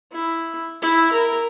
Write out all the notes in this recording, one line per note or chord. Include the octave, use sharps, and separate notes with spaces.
E4
E4
A#4